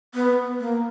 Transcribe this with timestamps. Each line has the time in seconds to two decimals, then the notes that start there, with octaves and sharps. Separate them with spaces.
0.15 B3
0.60 A#3